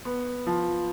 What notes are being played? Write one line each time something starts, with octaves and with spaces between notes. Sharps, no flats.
B3
F3